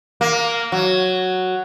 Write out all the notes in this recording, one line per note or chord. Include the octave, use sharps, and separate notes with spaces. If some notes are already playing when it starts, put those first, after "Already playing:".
A#3
F#3